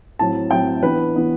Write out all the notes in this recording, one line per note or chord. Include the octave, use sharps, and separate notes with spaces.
A2 F#3 C4 A5
A2 F#3 C4 G5
E3 B3 D4 B4
E3 B3 D4